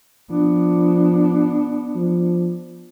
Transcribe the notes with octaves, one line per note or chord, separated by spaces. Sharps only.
F3 B3 D4
F3